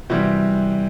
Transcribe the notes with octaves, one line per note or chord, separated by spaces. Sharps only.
C3 E3 G3 F#4